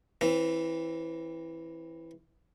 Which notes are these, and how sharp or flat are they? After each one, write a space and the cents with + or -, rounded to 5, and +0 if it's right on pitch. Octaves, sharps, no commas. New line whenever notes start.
E3 +0 C4 +30